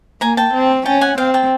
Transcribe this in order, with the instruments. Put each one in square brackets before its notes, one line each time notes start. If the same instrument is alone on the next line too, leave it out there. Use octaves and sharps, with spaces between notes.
[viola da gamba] A#3 [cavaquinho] G#5 A#5
[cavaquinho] G5 A5
[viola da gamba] C4
[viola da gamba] C#4 [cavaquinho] G5 A5
[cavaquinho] F#5 G#5
[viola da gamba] C4 [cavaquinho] F5 G5
[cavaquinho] G5 A5